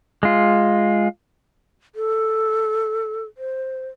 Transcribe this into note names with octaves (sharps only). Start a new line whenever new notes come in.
G#3 F4
A4
C5